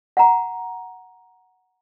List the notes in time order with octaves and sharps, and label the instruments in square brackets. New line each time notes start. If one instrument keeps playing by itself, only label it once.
[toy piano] F#5 A#5